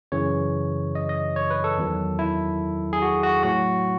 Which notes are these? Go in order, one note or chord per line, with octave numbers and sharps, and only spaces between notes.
F#2 C#3 E3 C#5
D#5
D#5
C#5
B4
A4
E2 D#3 F#3
E4
G#4
F#4
F#4
A2 F#3 F#4